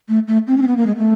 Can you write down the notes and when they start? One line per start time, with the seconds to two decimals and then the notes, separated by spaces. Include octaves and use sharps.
0.09 A3
0.28 A3
0.47 C4
0.57 C#4
0.62 C4
0.67 B3
0.77 A#3
0.86 G#3
0.96 A3